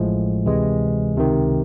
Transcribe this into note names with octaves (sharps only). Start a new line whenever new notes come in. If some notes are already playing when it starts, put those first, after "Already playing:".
Already playing: A1 A2 F3 G#3
D2 C3 E3 G#3
C#2 C3 D#3